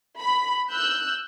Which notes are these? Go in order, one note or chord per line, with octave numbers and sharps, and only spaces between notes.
B5
E6 F#6 G6